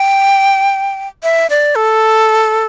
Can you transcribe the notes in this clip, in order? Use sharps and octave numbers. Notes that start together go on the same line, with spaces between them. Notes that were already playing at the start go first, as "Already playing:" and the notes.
Already playing: G5
E5
D5
A4